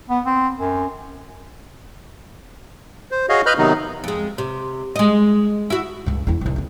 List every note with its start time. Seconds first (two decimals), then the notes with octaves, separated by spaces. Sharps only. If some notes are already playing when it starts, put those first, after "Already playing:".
0.10 B3
0.26 C4
0.59 F#2
3.11 C5
3.29 F#4 G#4 C#5 D#5 F5
3.46 B4 D#5 B5 F6 G6
3.58 C3 D#3 F#3 B3 D#4
4.04 F2 G#3
4.38 C3
4.96 G#3 D#5
5.70 E4 F#4
6.06 C#2 G2
6.27 E2 E4
6.41 C2 D#3
6.56 F2 D3